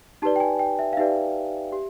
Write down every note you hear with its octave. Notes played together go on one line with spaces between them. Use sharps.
D#4 G4 B4 D5 A5
G5
G#5
G5
E5
F5
D#4 G4 B4 D5 E5
G4